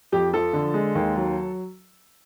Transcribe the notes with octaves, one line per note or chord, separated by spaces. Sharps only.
F2 G4
F3 A4
D3
G#3
D#2
F#3